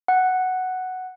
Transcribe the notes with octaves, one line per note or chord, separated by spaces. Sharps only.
F#5